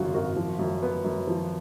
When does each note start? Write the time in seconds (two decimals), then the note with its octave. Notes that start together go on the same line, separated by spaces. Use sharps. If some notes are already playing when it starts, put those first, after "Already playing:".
Already playing: G#1 F#2 C#3 F4 F#4
0.14 G#1 F#4 A#4
0.36 F3
0.59 F#2
0.82 B3
1.04 F#2
1.27 F3